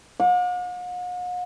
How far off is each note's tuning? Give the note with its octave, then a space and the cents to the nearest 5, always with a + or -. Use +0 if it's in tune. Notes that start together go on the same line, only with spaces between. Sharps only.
F#5 -45 D6 +10